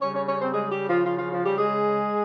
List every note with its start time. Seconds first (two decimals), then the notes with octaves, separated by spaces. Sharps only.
0.01 C#3 G3 C#4 C#5
0.14 C#4 C#5
0.27 C#4 C#5
0.40 C4 C5
0.53 G#3 G#4
0.70 G3 G4
0.88 F3 F4
1.06 F3 F4
1.19 F3 F4
1.32 F3 F4
1.45 G3 G4
1.58 G#3 G#4